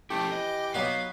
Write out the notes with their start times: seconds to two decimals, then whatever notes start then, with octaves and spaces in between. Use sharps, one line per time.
0.10 F3 A3 C#4 E4 G4
0.32 E3 D#5
0.74 F#3 B3 D#4 F#4 F5